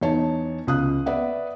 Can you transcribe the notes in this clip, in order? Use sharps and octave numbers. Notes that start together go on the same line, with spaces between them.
E2 D#4 C#5 A5
C#2 D#6 F#6
B4 D5 E5 F#5